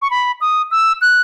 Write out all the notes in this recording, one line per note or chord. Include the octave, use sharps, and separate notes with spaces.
C#6
B5
D#6
E6
F#6